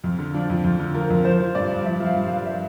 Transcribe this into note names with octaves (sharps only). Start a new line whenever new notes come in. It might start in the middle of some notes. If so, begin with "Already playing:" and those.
F2
D3
F3 D4
F2
F2
D3
F3 A#4
F2
F3 C5
F3
G2 D5
G2
F3 E5
F3
F5
G2
F5
G2
E5